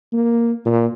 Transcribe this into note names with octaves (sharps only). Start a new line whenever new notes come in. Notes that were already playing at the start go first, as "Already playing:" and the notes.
A#3
A#2